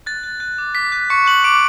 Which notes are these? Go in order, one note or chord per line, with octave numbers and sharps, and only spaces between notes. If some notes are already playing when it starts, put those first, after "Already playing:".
F#6 A6
F#6
F#6
D6
D6 B6
F#6
C#6 F#6 C#7
F#6 F#7
C#6 D6 D7